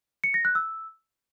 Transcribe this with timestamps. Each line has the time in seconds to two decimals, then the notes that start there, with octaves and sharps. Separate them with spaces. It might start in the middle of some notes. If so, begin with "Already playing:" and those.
0.24 C#7
0.34 A#6
0.45 F#6
0.55 E6